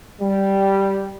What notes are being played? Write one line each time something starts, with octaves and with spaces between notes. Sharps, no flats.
G3